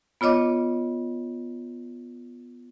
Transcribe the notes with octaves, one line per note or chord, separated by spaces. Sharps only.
B3 F4 C#5 D#5 D6